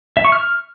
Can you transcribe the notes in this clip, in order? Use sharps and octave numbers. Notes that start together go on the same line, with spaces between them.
E5
C#6
F6